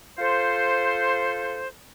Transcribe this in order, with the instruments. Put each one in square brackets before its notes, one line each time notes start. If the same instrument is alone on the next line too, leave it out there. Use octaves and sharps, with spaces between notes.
[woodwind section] F4 A4 C5